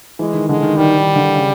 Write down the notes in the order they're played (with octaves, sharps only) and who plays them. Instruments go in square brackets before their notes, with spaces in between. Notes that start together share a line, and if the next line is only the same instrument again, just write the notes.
[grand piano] E3 [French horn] G#3
[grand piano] D#3
[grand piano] D3 [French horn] G#3
[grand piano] D#3
[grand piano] D#3 [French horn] G3
[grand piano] D#3
D3
C#3